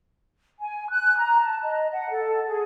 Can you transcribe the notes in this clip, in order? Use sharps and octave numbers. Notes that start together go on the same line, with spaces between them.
G#5
F#6
A#5
A5
D#5
F#5
A4
G#4